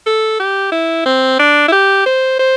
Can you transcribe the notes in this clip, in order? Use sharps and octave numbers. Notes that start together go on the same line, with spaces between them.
A4
G4
E4
C4
D4
E4
G4
C5
C5